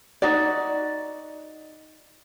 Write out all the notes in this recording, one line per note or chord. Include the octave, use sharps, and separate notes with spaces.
D#4 F#4 D5